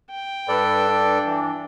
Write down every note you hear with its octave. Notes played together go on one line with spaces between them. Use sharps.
G5
G2 A4 B4 D5
D4
E3